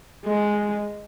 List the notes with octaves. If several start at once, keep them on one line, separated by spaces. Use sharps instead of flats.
G#3